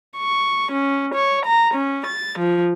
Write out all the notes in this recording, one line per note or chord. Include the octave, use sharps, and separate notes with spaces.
C#6
C#4
C#5
A#5
C#4
A6
F3